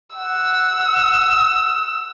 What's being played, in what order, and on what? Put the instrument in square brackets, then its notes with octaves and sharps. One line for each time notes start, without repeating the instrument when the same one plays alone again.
[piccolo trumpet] F#5 [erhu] E6